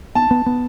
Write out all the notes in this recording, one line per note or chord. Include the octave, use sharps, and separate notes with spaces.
B3 A5
B3
B3